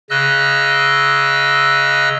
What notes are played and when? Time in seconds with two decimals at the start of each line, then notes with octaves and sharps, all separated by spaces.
0.10 C#3 D#5 E6 F#6